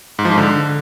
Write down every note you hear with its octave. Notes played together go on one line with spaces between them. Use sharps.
G#2
F3
G#2
D3